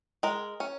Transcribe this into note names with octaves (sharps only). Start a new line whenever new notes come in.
G#3 A#4
C#4